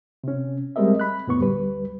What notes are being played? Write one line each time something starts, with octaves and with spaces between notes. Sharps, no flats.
C3 C#4
G3 G#3 C4 A#4 D#5 E5
B5 F#6
F2 A2 B3 C#6
D2 G3 B4